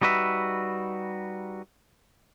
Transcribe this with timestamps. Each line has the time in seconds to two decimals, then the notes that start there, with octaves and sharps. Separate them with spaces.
0.02 G3 D#4 F#4 B4 E5